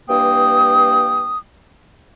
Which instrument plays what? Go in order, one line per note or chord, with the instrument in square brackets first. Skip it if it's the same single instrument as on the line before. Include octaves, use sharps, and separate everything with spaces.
[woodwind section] G2 E3 A#3 G5 D#6